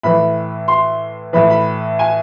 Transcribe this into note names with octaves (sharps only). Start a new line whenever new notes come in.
A2 E3 B5
C6
A2 E3 B5
B5
G#5